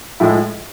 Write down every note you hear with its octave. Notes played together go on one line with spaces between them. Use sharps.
A2 F3 G#3 E4